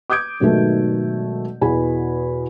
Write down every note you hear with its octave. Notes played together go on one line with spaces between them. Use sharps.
D6 D#6 G6 G#6 D7
G#1 B2 D#3 F#3 A3 G4
E2 B2 G#4 G#5 B5